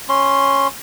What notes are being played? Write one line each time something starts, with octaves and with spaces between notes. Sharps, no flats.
C#4 C6